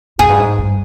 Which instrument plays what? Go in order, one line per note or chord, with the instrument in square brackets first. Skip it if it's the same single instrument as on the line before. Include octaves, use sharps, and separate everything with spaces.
[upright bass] F2 [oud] G#4
[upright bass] G2
G#2
G2